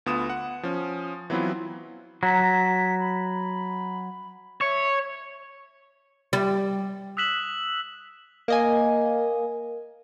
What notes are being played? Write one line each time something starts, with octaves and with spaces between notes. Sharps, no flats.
D2 B3 F4 D#6 E7
F#5
F3 C#4
E3 F#3 B3 C4 E4 F4
F#3 A#5 B6
B5
C#5 E5
G3
D#6 E6 F#6 B6 E7 F#7
A#3 D#5 G#5